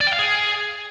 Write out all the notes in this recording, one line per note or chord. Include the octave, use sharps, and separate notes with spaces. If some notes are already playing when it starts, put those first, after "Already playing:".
D5
G5
F5
G#4